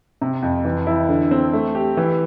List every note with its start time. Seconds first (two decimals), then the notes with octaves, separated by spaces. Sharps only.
0.22 C3
0.42 F2
0.65 E3
0.87 E4
1.09 D3
1.31 C4
1.53 A3
1.75 G4
1.97 E3